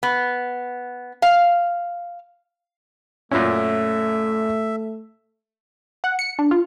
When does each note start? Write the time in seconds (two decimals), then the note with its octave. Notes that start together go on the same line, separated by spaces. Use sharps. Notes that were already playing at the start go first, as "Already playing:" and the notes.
0.03 B3
1.22 F5
3.31 F#2 A#2 A3 C#4 E5
6.04 F#5
6.19 C#7
6.39 D4
6.51 F4